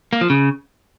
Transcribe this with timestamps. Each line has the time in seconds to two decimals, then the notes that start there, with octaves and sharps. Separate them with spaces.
0.13 A#3
0.21 F3
0.30 C#3